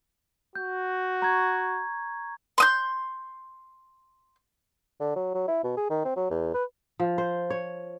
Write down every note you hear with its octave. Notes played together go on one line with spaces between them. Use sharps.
F#4 G6
A#5 C#6 G#6
C6 D#6 G6
D3
F#3
F#3
E4
B2
G#4
D#3
C4
F#3
E2
B4
F3
C5
C#5